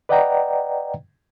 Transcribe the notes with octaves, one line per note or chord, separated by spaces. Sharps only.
B4 D5 D#5 F#5 G5 A#5